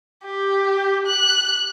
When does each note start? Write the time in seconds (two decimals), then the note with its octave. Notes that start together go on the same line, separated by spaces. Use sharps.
0.25 G4
1.06 F#6